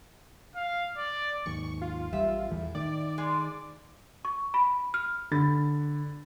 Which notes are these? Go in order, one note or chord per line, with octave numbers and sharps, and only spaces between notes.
F5
D5
D#2 G#2 C#6
F4
A1 G3 E5
E2 A2
D#3 D5
G#3
C#6
B5
F6
D3 B5 A6